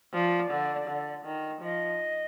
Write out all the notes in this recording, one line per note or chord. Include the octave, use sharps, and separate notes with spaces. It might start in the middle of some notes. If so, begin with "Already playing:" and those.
F3 D5
D3
D3
D#3
F3 D#5